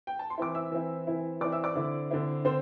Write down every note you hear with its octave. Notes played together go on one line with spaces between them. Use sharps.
G5
A5
C6
E3 C4 E4 D6
E5 E6
E3 C4 E4
E3 C4 E4
E3 C4 E4 D5 D6
E5 E6
D5 D6
D3 C4 E4
D3 C4 E4
D3 C4 C5 C6